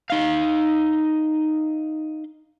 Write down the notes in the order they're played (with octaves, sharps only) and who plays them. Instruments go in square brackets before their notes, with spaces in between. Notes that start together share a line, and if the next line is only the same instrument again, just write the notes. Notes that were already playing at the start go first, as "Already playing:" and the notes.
[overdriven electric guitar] D#4 F5